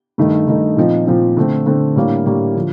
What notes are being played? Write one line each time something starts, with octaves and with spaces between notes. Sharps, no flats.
G2 D#3 A3 D#4
G2 D#3 A3 D#4
A#2 F3 C4 D#4
A#2 F3 C4 D#4
D3 A3 C4
D3 A3 C4
A2 G3 A#3 D4
A2 G3 A#3 D4
D3 F3